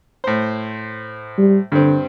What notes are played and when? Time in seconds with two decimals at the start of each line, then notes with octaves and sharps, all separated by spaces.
0.24 A2 C5
1.38 G3
1.72 G2 D3 C4